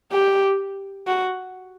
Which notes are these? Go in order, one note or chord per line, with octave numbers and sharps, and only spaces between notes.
G4
F#4